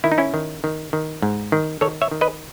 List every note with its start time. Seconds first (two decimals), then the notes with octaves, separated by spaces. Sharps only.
0.04 D#3 E4
0.12 D#4
0.18 C#4 E4
0.34 D#3
0.64 D#3
0.93 D#3
1.22 G#2
1.52 D#3
1.81 D#3 A4 C#5
2.02 C#5 E5
2.11 D#3
2.21 B4 D#5